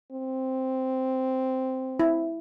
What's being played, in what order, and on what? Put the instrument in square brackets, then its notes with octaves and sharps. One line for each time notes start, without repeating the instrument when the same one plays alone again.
[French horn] C4
[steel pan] E4